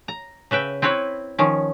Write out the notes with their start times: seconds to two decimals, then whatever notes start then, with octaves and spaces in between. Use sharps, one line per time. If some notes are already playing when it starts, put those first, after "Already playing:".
0.08 A#5
0.51 C#3 B4 E5 G5
0.82 C4 E4 B4 C#5
1.38 D#3 F3 C#4